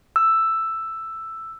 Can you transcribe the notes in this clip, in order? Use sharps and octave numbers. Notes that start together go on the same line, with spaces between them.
E6